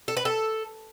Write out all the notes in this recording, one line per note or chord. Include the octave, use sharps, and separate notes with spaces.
A4
B4
A4